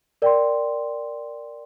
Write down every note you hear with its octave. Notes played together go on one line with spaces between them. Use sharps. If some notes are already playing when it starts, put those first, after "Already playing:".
A#4 D5 G5 C6